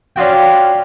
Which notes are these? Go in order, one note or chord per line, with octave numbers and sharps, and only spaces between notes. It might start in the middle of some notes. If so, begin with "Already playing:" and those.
C#4 D4 F4 F#4 G5